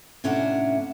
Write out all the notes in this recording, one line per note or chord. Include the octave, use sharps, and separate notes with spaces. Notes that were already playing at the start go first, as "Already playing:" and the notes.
A2 C3 C#4 D4 E5 F#5